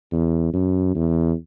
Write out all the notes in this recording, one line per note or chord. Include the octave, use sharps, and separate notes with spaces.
E2
F#2
E2